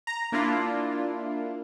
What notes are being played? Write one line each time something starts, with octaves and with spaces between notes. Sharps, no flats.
A#5
A#3 D4 E4 F4